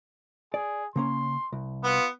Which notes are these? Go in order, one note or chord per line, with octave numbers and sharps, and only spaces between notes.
G#4 D5
C#3 A#3 C#4 C6
C2
B3 F4